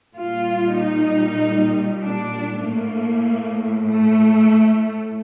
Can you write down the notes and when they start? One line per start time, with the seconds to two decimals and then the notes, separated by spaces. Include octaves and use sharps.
0.14 A#2 G3 F4
0.76 D#4
2.01 D4
2.63 A2 A3 A#3
3.87 A3